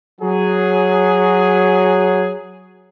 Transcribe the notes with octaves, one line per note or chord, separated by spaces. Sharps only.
F#3 G#4